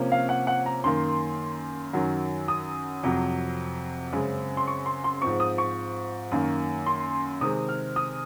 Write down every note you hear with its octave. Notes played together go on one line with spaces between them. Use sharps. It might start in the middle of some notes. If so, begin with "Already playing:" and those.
Already playing: C3 F3 A#3 C#4
F5
F#5
F#5
A#5
F#2 D#3 A#3 C6
F#2 D#3 F#3
D#6
F2 C3 F#3
F#2 C#3 G#3 C4
C6
C#6
C6
C6
G#2 F3 C4 C#6
D#6
C#6
F#2 D#3 A#3
C6
C3 D#3 G#3 C4 D#6
F6
D#6